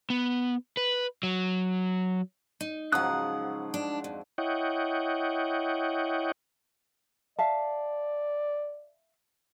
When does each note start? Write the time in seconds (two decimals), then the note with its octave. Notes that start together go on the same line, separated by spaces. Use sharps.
0.10 B3
0.77 B4
1.23 F#3
2.61 D#4
2.92 G#2 C#3 F3 F#3 F#5 D#6 F#6
3.74 D4
4.04 F2
4.38 E4 C#5 D#5 F#5 G5
7.39 D5 E5 F5 A5